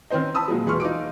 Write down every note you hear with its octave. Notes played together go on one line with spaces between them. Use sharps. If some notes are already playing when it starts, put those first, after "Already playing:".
D#3 C4 C#4 C5 D#5
A5 B5 D#6 E6
A#2 F3 F#3 G#3
E1 G#4 B4 C6 C#6 F6
D#4 F4 D6 D7